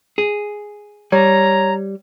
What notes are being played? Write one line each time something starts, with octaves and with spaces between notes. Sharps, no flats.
G#4
G3 C#5 A#5